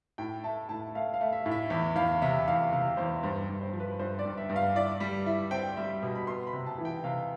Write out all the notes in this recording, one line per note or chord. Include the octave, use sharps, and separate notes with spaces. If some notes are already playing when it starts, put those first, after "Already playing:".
A2 G5
A3 A5
A2 A5
A3 F5
F5
A3
E5
A2
E5
E2 E5
E2 F5
C3 E5
E2 F5
C3 F5
E2 C5
G2 C5
G2
C5
F3
B4
G2 C5
D5
G2
E5
G2
F5
E4 D5
G3
E4
C4 G5
G3 E5
B2
B5
B3 C6
B5
C3
A5
E3
G5
C3 F5